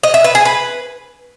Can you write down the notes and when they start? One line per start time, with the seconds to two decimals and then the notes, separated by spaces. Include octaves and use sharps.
0.03 D#5
0.14 E5
0.24 B4
0.35 G#4
0.45 B4